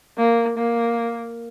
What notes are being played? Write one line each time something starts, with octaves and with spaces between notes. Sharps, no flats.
A#3
A#3